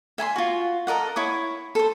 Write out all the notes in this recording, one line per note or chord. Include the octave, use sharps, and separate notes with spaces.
E5 G#5 A#5 C6
F4 F#4
A4 A#4 D#5 F#5
E4 C#5 D#6
A4 C5